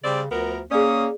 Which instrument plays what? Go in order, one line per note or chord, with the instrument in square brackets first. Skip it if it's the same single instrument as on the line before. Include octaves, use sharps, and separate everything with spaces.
[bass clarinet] C#3 [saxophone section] G3 C4 D5
[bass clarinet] D2 [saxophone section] F3 B3 A#4
[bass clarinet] A#3 [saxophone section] C#4 [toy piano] G#4 D5 [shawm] D#6